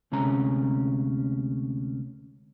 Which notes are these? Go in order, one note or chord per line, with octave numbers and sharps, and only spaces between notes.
D2 C3 G#3 C#4 A#5